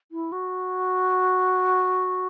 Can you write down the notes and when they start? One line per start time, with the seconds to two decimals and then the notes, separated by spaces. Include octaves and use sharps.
0.12 E4
0.32 F#4